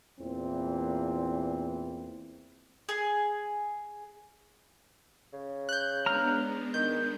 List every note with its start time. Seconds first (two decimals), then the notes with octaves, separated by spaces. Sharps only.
0.20 E2 A#2 E3 C4
2.89 G#4
5.33 C#3
5.69 F#6 G6
6.06 G#3 B3 D4 A#5 F6
6.74 D#3 G6